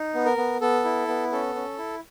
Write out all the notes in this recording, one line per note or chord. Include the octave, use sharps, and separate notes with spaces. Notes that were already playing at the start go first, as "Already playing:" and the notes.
Already playing: D#4
B3
A#4
B3
B3 A4
E4
B3
C#4 A4
C#4
E4